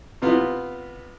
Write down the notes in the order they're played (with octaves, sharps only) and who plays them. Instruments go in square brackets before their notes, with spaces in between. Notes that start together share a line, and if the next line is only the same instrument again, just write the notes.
[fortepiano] C3 B3 F4